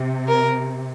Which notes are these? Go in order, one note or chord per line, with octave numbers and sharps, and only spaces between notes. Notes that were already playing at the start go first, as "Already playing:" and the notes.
Already playing: C3
A#4